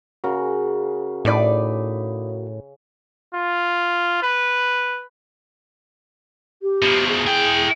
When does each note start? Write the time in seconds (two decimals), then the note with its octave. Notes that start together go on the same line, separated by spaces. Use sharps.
0.24 C#3 F#4 A#4
1.25 A2 D#4 B4 D5
3.35 F4
4.23 B4
6.62 G4
6.82 B2 F3
7.08 G#4
7.27 E4 G5